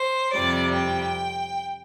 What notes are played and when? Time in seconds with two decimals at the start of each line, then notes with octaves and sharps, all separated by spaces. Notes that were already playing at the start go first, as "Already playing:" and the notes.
Already playing: C5
0.33 F2 C3 G3 D5
0.74 G5